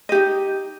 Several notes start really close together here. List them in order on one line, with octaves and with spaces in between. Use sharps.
D#5 G4 D#4